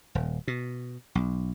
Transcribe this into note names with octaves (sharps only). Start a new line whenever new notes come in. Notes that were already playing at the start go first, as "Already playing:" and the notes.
D#1
B2
B1